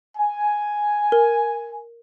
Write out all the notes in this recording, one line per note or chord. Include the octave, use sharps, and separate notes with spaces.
G#5
A#4